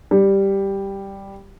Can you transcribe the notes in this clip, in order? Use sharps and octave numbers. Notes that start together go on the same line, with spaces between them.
G3